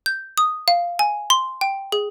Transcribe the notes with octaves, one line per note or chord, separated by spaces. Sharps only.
G6
D#6
F5
G#5
C6
G5
G#4